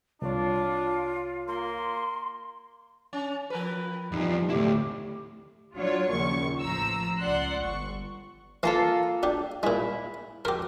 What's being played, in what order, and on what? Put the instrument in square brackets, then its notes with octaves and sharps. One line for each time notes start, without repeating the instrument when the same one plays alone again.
[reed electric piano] C2 C#5 [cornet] D4 [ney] F4
[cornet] A#3 [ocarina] C6
[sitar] C#4
F3 A#4 B4
[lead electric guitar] E2 F3 [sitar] G3 [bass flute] D#4
[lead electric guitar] D2 E4 [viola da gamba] A2 [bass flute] G4
[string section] F#3 D4 F4 C#5
A#1 D#2 C#3 C#6
A1 F3 A#5 E6
C#2 D5 F#5 C6 F#6
G1 C#6
[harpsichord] E3 [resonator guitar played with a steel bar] A#3 F4 A4
[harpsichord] D4 G4
[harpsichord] A#2 G#3 [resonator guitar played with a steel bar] E4
[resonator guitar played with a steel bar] F2 [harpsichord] G4 A#4